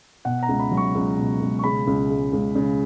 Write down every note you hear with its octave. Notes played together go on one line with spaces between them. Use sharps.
B2 F#5
A#5
C#2
B5
F#3
C#6
C#2
B2
C#2
C#6
C#3 B5
C#2
G#3
C#2
C#3